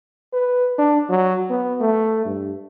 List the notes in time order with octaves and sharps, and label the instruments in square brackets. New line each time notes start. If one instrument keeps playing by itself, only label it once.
[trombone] B4
D4
F#3
B3
A3
G2